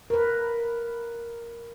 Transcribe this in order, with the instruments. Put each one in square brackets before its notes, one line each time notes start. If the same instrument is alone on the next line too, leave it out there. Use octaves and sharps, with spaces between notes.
[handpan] A#4 B4